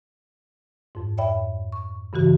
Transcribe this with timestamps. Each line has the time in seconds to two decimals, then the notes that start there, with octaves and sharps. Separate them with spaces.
0.95 F2 G#2
1.18 C#5 D5 E5 G5 B5
1.72 C#6
2.13 G2 C#3 E3 F#4